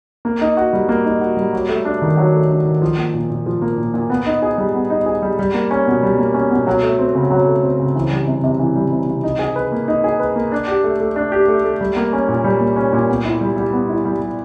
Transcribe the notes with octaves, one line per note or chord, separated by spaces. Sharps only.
A#3
D#4
F#4
G3
A#3
D#4
F#4
G3
F#3
A3
D4
D#3
F#3
A3
D4
D#3
F3
A#3
A#2
A#2
F3
A#3
A#2
A#2
B3
D#4
G#4
G3
B3
D#4
G#4
G3
G3
A#3
C#4
B2
G3
A#3
C#4
B2
F#3
A3
C4
C#3
F#3
A3
C4
C#3
E3
G3
C3
C3
E3
G3
C3
C3
D#4
G#4
B4
A#3
D#4
G#4
B4
A#3
D4
G4
A3
A3
D4
G4
A3
A3
G3
A#3
C#4
A#2
G3
A#3
C#4
A#2
B3
E4
G3
G3
B3
E4
G3
G3